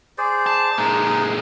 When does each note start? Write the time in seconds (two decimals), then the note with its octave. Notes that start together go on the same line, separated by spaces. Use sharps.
0.18 G#4 C5 D5
0.46 A5
0.78 A#2 G#3 D#4